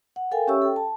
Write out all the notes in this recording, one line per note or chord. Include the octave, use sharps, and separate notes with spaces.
F#5
A4 A#4 F5 G5 G#5
C#4 G4 C#5 E5 C#6 E6
A4 G5
A5